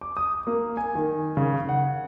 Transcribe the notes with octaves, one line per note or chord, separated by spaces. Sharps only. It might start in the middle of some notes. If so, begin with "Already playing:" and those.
D6
D#6
A#3
G#5
D#3
C#3
F#5